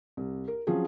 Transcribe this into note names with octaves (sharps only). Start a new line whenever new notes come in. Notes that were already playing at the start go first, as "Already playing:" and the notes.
C2
A#4
F3 F#3 C4 C#4 G#4